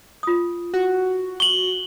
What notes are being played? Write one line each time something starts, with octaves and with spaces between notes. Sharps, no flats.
F4 D#6
F#4
C#6 F#7 G7